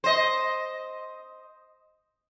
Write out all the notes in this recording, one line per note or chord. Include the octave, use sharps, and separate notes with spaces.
C5 D#5